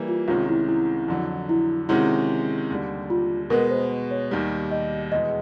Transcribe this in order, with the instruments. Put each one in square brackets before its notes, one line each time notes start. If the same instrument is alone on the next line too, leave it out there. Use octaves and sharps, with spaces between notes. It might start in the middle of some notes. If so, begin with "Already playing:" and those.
Already playing: [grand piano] E3 G3 A#3
[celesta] F4
[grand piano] C2 C3 D#3 G#3 C#4 [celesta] F4
[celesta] E4
E4
[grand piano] F2 D3 F#3
[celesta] E4
[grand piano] C3 D#3 G#3 C#4 F#4 [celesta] E4
[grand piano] D#2 D3 G3
[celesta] F4
[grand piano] B2 G#3 B3 [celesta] A#4
[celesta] C5
C#5
[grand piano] D#2 D#3 G3
[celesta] D#5
[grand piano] E2 B2 G#3 [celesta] D#5